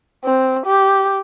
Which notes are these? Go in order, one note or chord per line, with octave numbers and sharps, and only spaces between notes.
C4
G4